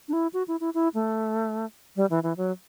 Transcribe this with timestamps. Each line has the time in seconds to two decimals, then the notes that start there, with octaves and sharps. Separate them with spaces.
0.08 D4
0.13 E4
0.34 F#4
0.48 E4
0.60 E4
0.74 E4
0.94 A3
1.96 G3
2.11 E3
2.23 E3
2.37 F#3